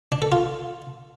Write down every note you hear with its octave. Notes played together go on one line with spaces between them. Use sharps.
D4
A4
F4